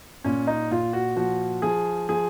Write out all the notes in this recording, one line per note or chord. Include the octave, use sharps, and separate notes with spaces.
A#2 C#4
D#4
A#2 F4
F#4
F3 F#4
F3 G#4
F3 G#4